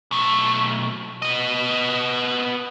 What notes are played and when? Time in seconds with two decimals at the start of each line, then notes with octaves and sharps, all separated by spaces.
0.11 B1 A3
1.22 B3 D#5